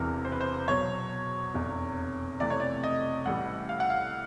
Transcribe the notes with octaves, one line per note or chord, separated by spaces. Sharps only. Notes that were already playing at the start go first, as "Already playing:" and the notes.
Already playing: E1 E2 C3 E3 A#4
C5
B4
C5
E2 B2 F#3 C#5
F1 E2 C3
F2 C3 E3 A3 D5
C#5
D5
D#5
A1 A2 E3 G3 F#5
F5
F#5
F5